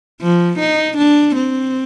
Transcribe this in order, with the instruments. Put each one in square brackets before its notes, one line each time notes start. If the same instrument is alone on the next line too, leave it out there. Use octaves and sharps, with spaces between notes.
[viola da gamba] F3
D#4
D4
C4